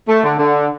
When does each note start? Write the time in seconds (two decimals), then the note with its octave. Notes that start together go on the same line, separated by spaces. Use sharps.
0.08 A3
0.23 D3
0.38 D3